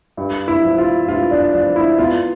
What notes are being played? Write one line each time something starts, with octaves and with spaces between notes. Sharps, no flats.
G2
E4
F3
F4
G2 F4
D4
F3 D4
E4
E2 F4